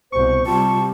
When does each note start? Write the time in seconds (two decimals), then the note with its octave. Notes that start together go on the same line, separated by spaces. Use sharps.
0.12 C2 B2 C5 C#6
0.47 C3 G3 F4 A5